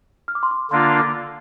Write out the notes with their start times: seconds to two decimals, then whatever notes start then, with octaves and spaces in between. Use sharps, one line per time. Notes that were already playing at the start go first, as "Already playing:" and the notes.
0.28 F6
0.35 D6
0.43 C6
0.51 D6
0.71 D3 A#3 D4 F4 C6
0.99 D6